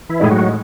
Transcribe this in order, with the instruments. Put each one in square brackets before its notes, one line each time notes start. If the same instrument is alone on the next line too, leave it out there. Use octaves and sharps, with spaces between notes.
[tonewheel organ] E3 E4
[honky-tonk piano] A2 G#3 D#4 [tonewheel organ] G#4
[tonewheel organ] F#3 F#4